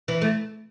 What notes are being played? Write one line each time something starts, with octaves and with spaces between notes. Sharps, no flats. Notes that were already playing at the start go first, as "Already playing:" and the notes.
E3
A3